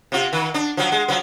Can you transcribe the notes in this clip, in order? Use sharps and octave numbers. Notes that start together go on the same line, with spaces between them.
C3 F4
D#3
D4
F3 F#3
G#3
F3 F#3 B3